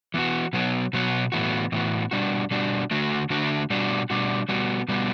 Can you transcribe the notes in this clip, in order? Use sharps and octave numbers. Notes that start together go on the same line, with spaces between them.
E3 B3 F#4
B2 F#3 B3
B2 F#3 B3
A2 E3 B3 F#4
A2 E3 B3 F#4
B2 G3 D4 F#4
B2 G3 D4 F#4
D3 A3 D4 F#4
D3 A3 D4 F#4
B2 G3 D4 F#4
B2 G3 D4 F#4
B2 G3 B3 F#4
B2 G3 B3 F#4